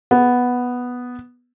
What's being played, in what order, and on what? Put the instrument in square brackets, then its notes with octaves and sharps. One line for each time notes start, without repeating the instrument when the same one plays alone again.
[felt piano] B3